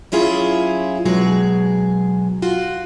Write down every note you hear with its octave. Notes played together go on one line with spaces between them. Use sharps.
F#3 C#4 E4 F4 G#4
B2 F#3 G#3 G#4
F4 F#4